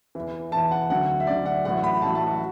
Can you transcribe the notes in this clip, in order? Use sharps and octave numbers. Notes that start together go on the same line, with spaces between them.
E2 E3
E2 E3 A5
F#5
D2 D3 F#3 F#5
E5
D2 D3 F#3 D5
F#5
A1 A2 F#3 F#5
B5
A1 A2 F#3 A5
A5
F#4